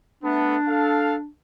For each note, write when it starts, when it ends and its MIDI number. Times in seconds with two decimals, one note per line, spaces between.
0.23 0.56 57
0.23 0.56 59
0.23 1.27 62
0.67 1.15 69
0.67 1.15 77